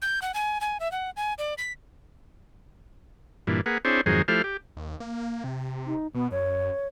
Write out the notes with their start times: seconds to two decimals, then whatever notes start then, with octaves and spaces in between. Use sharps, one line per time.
0.02 G6
0.22 F#5
0.34 G#5
0.61 G#5
0.80 E5
0.92 F#5
1.16 G#5
1.38 D5
1.58 B6
3.47 G2 A#2 E3
3.66 A#3 G#4 B4 F#5
3.85 C4 D4 E4 G#4 C5 C#5
4.06 F2 G#2 D#3 F#3 G#4 C5
4.28 F3 A3 E4 G4 C5 F6
4.44 G4
4.77 D#2
5.00 A#3
5.44 C3
5.87 D#4
6.15 B2 B3
6.31 F#2 C#5